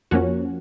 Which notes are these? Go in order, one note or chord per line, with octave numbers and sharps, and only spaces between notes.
F2 F3 A#3 C#4 F#4